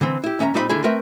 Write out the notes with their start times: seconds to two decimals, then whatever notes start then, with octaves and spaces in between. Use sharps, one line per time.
0.01 D3 E3 C4
0.24 E4 G4
0.39 D#2 C#4 E5 G#5 A#5
0.54 A#2 G3 C4 D#4 C#5 B5
0.69 D#2 D3 E4 G#4
0.84 A3 C4 A#4 B4 E5